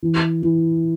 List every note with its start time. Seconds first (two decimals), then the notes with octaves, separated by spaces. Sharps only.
0.03 E3
0.42 E3